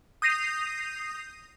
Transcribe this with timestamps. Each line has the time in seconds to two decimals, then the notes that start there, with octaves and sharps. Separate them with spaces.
0.22 D#6 G6 A#6 C7 D#7 F7